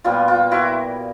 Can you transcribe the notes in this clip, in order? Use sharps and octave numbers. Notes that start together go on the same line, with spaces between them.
A#2 G3 B3 F4
F4
E4 F#4